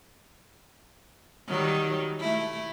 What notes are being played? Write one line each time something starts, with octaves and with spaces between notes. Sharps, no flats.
D#3 F#3 G3
A3 E4